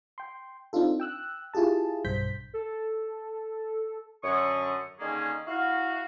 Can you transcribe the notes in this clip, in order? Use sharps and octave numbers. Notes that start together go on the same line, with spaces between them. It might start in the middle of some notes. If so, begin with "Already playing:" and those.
G5 C6
C4 D4 D#4 F4 A4
G5 E6 F#6
E4 F4 G4 G#4 A5
B1 G2 C5 G6 B6
A4
F#2 D3 C#6 D#6
D3 D#3 A#3 C#4 G#4
E4 F#4 F5